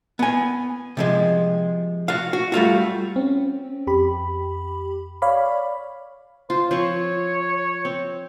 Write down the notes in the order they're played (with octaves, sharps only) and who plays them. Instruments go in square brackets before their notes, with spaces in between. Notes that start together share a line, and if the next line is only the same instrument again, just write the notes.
[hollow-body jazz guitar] B3 G#5
C3 F3 G#3
F#4 F5
F#4
G3 A3 F4 F#4
[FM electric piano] C4 C#4
F2 G4 B5
C#5 D5 F5 B5
[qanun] F4 [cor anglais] C5
[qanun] F3 C4 C#6 [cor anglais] C#5
[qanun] C4